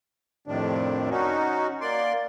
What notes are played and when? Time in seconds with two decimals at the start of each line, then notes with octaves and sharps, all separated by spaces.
0.47 F2 A2 C3 D#3 D4
1.10 C#4 D#4 F#4
1.81 A#3 D5 C6